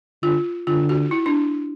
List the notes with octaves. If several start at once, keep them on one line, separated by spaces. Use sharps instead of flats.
D3 F4
D3 F4
F#4
E4
D4